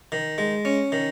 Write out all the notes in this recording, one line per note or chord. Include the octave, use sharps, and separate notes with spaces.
D#3
G#3
C#4
D#3